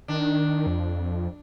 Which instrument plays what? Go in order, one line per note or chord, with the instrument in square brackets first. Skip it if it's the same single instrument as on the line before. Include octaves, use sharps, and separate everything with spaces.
[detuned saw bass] D#3 [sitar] D4
[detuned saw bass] F2